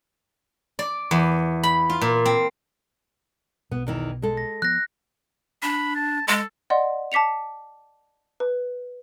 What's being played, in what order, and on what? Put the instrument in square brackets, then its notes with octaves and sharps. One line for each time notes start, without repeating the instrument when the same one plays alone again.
[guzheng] D5
E2
B5
F4
A#2
C4
[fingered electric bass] B1 B2 [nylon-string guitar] B3
[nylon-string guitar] E2 D#3 E4
G#3 A4
[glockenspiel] A#6
[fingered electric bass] F3 B3 [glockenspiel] F#6 A#6
[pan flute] D4 [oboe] B5
[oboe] A5
[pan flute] G#3 [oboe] A4
[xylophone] D5 D#5 F#5 C6
A5 D6 B6 C#7 F7
B4